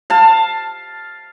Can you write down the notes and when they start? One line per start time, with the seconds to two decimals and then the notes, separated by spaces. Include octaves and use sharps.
0.10 F5 A5